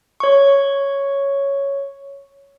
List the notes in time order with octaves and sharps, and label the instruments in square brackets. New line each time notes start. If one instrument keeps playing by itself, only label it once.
[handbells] C#5 C#6